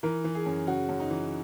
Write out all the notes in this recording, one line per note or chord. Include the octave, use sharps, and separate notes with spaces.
E3 A#4
E3
G#4
F#2
C#3 F#4
F#2
D#4
E3